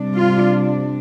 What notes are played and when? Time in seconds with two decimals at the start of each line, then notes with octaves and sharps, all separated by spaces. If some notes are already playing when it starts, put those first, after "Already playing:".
Already playing: C3 G3 D4
0.16 F4